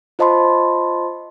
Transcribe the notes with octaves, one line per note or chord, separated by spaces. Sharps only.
F4 C5 D#5 A5 B5 C6